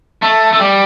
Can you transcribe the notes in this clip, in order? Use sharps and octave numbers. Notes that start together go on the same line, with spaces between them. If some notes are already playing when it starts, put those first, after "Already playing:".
A3
A3
G3